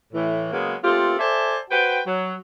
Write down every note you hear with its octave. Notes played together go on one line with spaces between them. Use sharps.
A2 E3
C#3 F#3 G#3 A#3 B3
A3 A#3 C4 F4 G4 A4
A4 C5 D5 E5 G#5 A5
F#4 B4 C5 G5
F#3